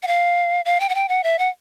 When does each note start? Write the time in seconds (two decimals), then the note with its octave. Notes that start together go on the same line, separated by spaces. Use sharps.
0.03 F#5
0.07 F5
0.65 F5
0.80 G5
0.89 F#5
0.95 G5
1.09 F#5
1.24 E5
1.39 F#5